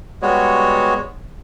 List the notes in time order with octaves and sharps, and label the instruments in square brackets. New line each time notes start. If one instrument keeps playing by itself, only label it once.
[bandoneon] G3 G#3 B3 F#4 C#5